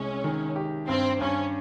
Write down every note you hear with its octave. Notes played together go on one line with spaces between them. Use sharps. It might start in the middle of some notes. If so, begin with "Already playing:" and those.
Already playing: C2 G#3 C#4
D#3
G4
G2 C4
G2 C#4